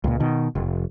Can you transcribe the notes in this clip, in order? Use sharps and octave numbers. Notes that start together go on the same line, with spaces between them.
C#2 A#2
B2 D#3
F1